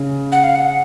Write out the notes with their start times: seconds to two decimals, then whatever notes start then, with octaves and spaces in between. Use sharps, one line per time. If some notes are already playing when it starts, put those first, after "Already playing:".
Already playing: C#3
0.32 F#5
0.44 F5
0.56 F#5